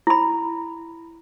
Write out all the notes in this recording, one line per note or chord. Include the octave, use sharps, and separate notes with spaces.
E4 B5